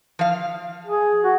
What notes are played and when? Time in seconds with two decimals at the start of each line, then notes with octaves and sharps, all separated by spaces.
0.19 F3 F5
0.87 G#4
1.23 F#4